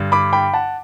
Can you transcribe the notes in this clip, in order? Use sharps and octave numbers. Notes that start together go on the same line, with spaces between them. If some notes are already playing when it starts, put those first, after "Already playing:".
Already playing: G2 D3
B5 D6
G5 B5
F#5 A5